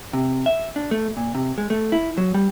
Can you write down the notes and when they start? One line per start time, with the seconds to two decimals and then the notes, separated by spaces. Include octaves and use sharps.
0.13 C3
0.46 E5
0.76 D4
0.91 A3
1.17 A#2
1.35 C3
1.58 G#3
1.70 A3
1.92 E4
2.18 F#3
2.34 G3